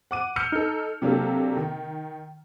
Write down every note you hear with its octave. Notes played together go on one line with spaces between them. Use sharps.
F#5 D6 D#7
E6 F6 G6 C#7
D#4 A4
C3 F#3 A#3 D4 G4 A4
D#3